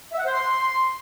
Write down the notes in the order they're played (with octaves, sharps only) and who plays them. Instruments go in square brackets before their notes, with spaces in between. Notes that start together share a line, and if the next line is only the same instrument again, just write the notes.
[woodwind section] E5
F#5
C5
C6